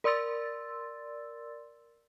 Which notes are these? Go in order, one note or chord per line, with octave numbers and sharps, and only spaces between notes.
A#4 D5 C6 E6 A6